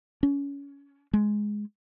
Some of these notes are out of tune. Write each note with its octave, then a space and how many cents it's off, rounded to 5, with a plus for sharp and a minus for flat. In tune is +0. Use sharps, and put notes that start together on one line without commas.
C#4 +25
G#3 +5